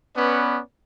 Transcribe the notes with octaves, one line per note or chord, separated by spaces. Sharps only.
B3 C#4 B4 D5